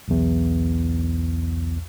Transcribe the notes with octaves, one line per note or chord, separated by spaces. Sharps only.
B1 E2